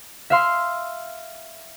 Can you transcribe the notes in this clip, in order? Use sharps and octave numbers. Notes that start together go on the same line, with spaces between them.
E5 F5 C6